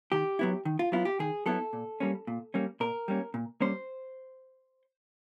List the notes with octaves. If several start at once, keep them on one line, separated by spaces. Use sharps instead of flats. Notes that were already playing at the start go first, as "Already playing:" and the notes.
D#3 G4
F#3 B3 E4
D#3
F4
F#3 B3 E4 F4
G4
D#3 G#4
F#3 B3 E4 A4
A#2
G3 A#3 C#4
A#2
G3 A#3 C#4
A#2 A#4
G3 A#3 C#4
A#2
G3 A#3 C#4 C5